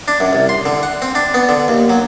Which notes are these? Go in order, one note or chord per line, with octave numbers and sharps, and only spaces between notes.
D4
F#2
C2
C6
D3
F#5
C4
D4
B3
D3
D#2
F#3